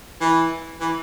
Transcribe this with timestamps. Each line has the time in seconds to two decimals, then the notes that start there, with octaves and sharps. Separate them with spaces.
0.21 E3
0.81 E3